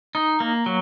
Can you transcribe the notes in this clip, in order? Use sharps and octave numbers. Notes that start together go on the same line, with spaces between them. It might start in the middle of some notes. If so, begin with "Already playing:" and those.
D#4
A#3
F#3